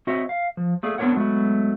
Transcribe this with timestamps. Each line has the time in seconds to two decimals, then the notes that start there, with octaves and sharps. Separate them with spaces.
0.07 C4 F#4 C5 C#5 D#5 E5
0.29 F5
0.57 F3
0.83 A3 A#3 G#4 D5
0.98 B3 C4 D4 A#4 C#5 F#5
1.16 F#3 G#3 A3 B3 F#4